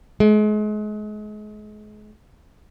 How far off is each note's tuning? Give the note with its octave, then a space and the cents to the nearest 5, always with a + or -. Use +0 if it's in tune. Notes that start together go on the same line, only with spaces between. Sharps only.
G#3 +35